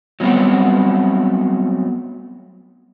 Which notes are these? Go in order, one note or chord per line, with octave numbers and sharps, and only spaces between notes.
F#3 G3 A3 B3 C4 C#5